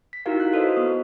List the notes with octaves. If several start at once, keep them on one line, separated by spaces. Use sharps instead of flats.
B6
D#4 E4 F#4 G4 A#4 F5
F#6
F#4 A4 B4 C5 D#5
B3 D#6